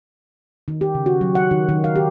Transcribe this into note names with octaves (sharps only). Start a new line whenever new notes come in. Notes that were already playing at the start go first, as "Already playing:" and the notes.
D#3
G4
C#3
F#4
F#3
F#5
D#3
D#3
F5
G4